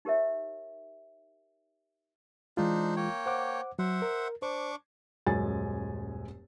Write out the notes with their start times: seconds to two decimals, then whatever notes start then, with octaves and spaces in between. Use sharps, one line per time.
0.05 D#4 G4 A#4 C#5 E5
2.57 E3 G#3 D4 D#4 F4 C5
2.96 A#3 C#5 G5
3.26 C5 F#5 D6
3.79 F#3 C5 E5 F#5
4.02 A#4
4.42 D4 C5 C#6 D6
5.26 D#1 F#2 G#3 G#5 A6